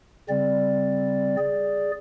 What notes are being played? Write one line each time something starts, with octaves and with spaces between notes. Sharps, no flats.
C#3 G3 C4 D5
G#4 D5